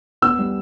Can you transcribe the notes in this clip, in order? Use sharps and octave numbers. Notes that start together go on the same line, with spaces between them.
B3 E6
G3